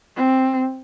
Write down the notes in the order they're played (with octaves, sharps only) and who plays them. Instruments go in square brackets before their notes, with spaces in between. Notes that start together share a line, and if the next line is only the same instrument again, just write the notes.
[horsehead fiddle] C4